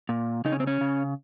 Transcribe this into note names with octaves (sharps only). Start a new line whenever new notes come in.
A#2
C#3 D#4
C#4
C4
C#4
C#3